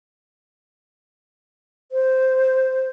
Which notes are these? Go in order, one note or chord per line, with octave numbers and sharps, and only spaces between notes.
C5